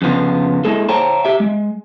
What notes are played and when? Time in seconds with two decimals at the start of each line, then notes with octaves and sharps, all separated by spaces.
0.02 F2 C#3 B3 F4
0.65 G#3 A#3 E4 G#4 A4
0.88 C5 C#5 F5 G5 A5 A#5
1.25 G4 E5
1.40 G#3